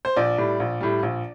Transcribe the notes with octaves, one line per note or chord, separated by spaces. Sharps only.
C5
A#1 D5
A2 G3
A#1
A2 G3
A#1